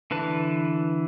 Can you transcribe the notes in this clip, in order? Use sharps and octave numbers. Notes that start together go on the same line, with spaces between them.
D3 E3 B4 A5